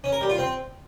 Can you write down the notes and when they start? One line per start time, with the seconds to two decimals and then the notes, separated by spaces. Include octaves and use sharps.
0.04 C#4
0.12 A#4
0.21 G3
0.30 F4
0.38 C4